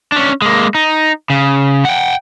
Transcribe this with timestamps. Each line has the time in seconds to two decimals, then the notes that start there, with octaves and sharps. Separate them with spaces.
0.12 C#4 D4
0.42 G#3 A#3
0.75 D#4
1.30 C#3
1.85 F#5 G5